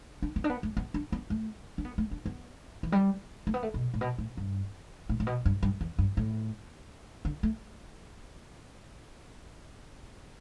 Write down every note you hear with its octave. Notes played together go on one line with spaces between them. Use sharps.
D4
B3
D4
B3
A3
B3
D4
B3
A3
D4
B3
A3
D4
B3
E3
G3
A3
B3
A3
B2
A2
B2
A2
G2
A2
A2
B2
G2
G2
E2
G2
A2
D3
A3